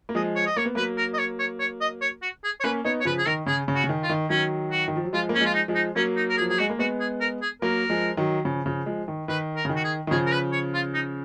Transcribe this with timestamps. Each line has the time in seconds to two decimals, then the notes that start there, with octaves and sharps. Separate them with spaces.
0.09 A#3
0.15 F3 G#3 D#5
0.36 C#5
0.47 D#5
0.56 A#3 C#5
0.66 B3
0.75 F#3 A#3 B4
0.98 A#4
1.14 D#5
1.18 C#5
1.39 C#5
1.60 C#5
1.81 D#5
2.01 C#5
2.22 F#4
2.44 G#4
2.60 C#5
2.64 A#3 C#4 B4
2.84 B3 D#4 C#5
3.00 C#5
3.05 C#3 F3 B4
3.18 G#4
3.26 D#3 A#4
3.46 C#3 G#4
3.68 C#3
3.75 F#4
3.84 C#3
3.89 D#3
4.03 F4
4.09 D#3
4.30 D#3 F#3 C#4
4.71 F#4
4.88 D#3
4.96 F3
5.04 F#3
5.13 F3 G#3 F4
5.29 A#3
5.34 C#4
5.40 F3 G#3 F4
5.54 D#4
5.68 F3 G#3
5.75 D#4
5.96 F#3 A#3 C#4
6.16 D#4
6.29 A#4
6.37 G#4
6.41 F3
6.49 F#3 G#4
6.59 G#3 F#4
6.70 A#3
6.79 G#3 B3 F#4
7.00 G#4
7.20 A#4
7.42 G#4
7.62 F#3 A#3 A#4
7.90 F3 G#3
8.17 D#3 F#3
8.45 C#3 F3
8.66 C#3 F3
8.86 F3 G#3
9.08 D#3
9.28 D#3 B4
9.56 A#4
9.65 C#3
9.69 D#3
9.76 F#4
9.84 G#4
10.07 D#3
10.11 C#3 F3 G#4
10.26 A#4
10.32 B4
10.52 C#5
10.74 F4
10.94 D#4